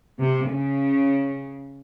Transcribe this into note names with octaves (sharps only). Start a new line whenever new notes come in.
C3
C#3